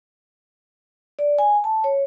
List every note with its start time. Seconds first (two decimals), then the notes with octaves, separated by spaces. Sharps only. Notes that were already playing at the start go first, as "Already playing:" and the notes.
1.19 D5
1.38 G#5
1.64 A5
1.84 C#5